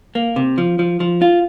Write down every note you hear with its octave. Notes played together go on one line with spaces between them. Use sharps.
A#3
C3
F3
F3
F3
F4